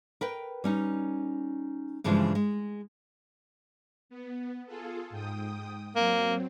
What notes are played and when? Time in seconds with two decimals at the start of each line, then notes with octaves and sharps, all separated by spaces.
0.21 A#4 B4 G5
0.64 G3 C#4 D#4
2.04 G2 C#3 E3 F3 G3 G#3
2.35 G#3
4.09 B3
4.66 F4 G#4 A4
5.10 G#2 G5 D#6
5.96 F#3 A#3 C4